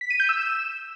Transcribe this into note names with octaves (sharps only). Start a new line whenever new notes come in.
B6
D#7
G6
E6
E7